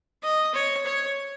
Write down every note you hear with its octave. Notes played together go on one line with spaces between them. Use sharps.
D#5
C#5
C#5